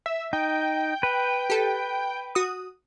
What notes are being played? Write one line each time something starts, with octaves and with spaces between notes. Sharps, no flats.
E5
D#4 G5
B4
G4 A4
F#4 D#6